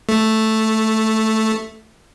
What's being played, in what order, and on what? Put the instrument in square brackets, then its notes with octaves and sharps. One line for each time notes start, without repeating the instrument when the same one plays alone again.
[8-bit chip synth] A3